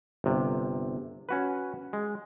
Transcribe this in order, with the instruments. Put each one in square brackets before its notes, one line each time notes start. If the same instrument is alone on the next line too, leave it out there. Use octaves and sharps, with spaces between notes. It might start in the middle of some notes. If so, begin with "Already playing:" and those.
[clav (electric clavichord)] G1 C3
C#4 F#4 B4
G#3